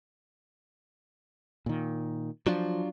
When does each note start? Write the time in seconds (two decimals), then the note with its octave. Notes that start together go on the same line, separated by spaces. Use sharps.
1.66 A#2 D#3
2.47 F3 F#3 D4 F4